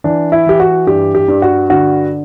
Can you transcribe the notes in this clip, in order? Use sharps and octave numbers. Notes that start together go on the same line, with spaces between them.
E3 D4
E4
E3 G4
F#4
G2 G4
G4
G2
F#4
D3 F#4